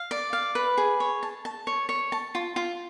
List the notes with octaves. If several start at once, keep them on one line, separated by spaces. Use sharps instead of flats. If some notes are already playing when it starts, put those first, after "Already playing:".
Already playing: F5
D5
F5
B4
G#4
C#5
A5
A5
C#5
C#5
A5
F4
F4